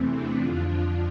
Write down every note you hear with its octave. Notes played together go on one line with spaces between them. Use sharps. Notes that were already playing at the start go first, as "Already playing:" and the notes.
Already playing: E2 C3 E3 A3 C4
B3 D4
F2 D3 F3 D4 F4